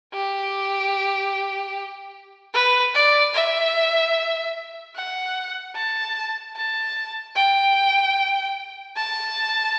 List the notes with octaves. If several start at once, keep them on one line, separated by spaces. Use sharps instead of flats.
G4
B4
D5
E5
F#5
A5
A5
G5
A5